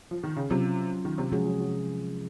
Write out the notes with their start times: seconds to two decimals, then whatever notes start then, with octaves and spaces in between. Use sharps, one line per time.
0.11 F3
0.23 D#3
0.36 C#3
0.50 C3 F#3 C#4 F4
1.05 D#3
1.18 C3
1.32 C3 F3 F#3 G#3 C#4 G#4
1.45 F#3
1.60 F#3